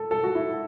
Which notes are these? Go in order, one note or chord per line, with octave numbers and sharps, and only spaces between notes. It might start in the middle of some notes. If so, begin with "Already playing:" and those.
Already playing: A4
A4
F#4
E4